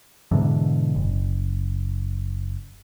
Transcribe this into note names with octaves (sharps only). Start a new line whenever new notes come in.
G#2 B2 D3 E3
F#1